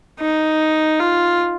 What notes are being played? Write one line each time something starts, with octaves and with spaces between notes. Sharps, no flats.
D#4
F4